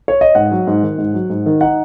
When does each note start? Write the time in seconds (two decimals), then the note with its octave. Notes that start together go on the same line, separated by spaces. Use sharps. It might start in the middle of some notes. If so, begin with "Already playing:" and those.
0.08 C#5
0.21 D#5
0.35 G#2 F#5
0.51 F#3
0.67 G#2
0.83 D#3
0.98 G#2
1.14 F#3
1.30 G#2
1.46 D#3
1.61 D#4 F#5